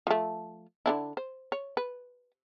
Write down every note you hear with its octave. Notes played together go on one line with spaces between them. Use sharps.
F3 A3
D3 D4 E4
C5
C#5
B4